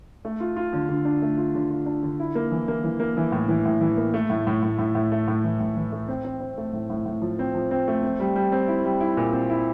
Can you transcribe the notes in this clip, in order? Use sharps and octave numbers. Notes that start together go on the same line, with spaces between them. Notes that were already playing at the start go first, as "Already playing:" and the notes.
A3
F4
F4
D3
D3
D4
A3
F4
D3
F4
D4
D3
E4
A#3
E3
A#3
E3
A#3
E3
A2
E3
A2
E3
A#3
A3
A2
A2
A2
A2
A2
A3
A2
E3
A2
E3
A3
C4
C4
C4
A3
A2
A2
A2
F3
C4
F3
C4
A3
C4
G3
G3
C4
E4
G3
E4
A#2
C4
E4